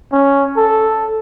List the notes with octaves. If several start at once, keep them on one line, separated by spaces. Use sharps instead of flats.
C#4
A4